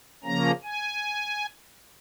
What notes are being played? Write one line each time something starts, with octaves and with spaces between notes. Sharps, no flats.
C#3 F3 A#3 C#4 A#5
G#5